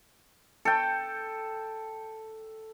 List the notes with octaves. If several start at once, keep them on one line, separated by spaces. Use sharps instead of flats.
A4 G5